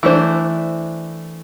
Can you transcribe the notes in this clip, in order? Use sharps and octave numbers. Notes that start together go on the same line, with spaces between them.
E3 A3 D4 C5